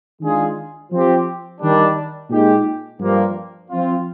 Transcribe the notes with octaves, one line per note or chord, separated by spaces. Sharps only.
D#3 G#3 D4 F4 G#4
F3 C4 G4
D#3 G3 D4
A#2 G#3 D#4 G4
G2 F3 A#3
F3 C4 F4